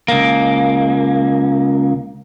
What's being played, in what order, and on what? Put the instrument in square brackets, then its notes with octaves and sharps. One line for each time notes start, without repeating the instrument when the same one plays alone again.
[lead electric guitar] C#2 A#3